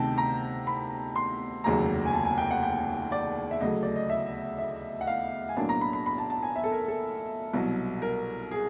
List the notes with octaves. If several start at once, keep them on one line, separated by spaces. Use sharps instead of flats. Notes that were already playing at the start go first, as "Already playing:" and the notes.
Already playing: D2 C3 D#3 G5 A5
A#5
B5
C6
F1 D#2 C#3 F#3 A#5
G#5
A5
G#5
G5
F#5
G5
D5
E5
D2 C#3 F#3 A3 D#5
D5
D#5
E5
E5
F#5
F5
G#5
B1 A2 F#3 A#3 D4 A5
A#5
B5
B5
B5
A5
A5
G#5
E5
A4
A#4
A4
C2 B2 F#3
A#4
G#4